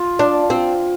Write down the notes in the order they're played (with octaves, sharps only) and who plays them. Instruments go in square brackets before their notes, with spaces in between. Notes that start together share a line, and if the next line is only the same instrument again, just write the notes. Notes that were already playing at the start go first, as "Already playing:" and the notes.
Already playing: [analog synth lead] F4
[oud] D4
C4